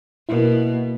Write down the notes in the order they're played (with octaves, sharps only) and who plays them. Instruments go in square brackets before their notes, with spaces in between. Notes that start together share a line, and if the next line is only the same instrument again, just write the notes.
[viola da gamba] B2 [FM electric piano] A#3 E4